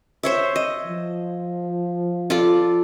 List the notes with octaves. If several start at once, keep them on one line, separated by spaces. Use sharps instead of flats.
C5 C#5 E5
D#5
F3
F4 A4 D5